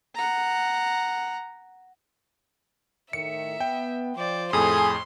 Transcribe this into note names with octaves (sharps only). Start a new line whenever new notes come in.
F#5 A#5
A2 D#3 E5 C#7
B3 G5
F3 C5 D5
F2 A2 G#4 A4 G#5 C6